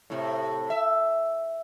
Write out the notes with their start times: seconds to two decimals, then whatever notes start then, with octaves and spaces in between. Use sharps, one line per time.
0.10 A2 C3
0.70 E5